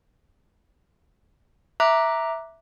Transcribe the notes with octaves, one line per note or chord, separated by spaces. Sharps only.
E5 A#5 D6 F#6